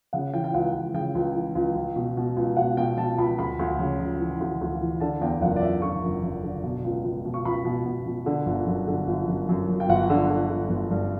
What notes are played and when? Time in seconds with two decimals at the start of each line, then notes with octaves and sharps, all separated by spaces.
0.13 C#3 F#5
0.33 E3 G5
0.44 G5
0.54 C#2 F#5
0.74 C#2
0.94 C#3 G5
1.15 C#2
1.35 E3
1.55 C#2
1.75 C#2
1.96 B2
2.17 B2
2.37 C#2
2.56 B2 F#5
2.77 B2 G5
2.97 B2 A5
3.18 C#2 B5
3.39 D2 B5
3.59 D2
3.79 C#3
4.00 C#3
4.19 E3
4.40 D2
4.61 D2
4.81 E3
5.00 D3 A5
5.21 E2 G5
5.41 F#1 F#5
5.56 D5
5.61 F#1 E5
5.82 D3 C#6
6.03 F#1
6.23 F#1
6.43 D3
6.63 B2
6.84 C#2
7.05 C#2
7.25 B2
7.34 C#6
7.45 C#2 B5
7.65 B2
7.85 B2
8.06 B2
8.26 D3
8.46 G1
8.67 F#2
8.87 D3
9.07 G1
9.28 F#2
9.49 F#2
9.69 F#2
9.80 G5
9.89 G1 F#5
10.10 D3
10.30 D3
10.50 D3
10.70 G1
10.90 G2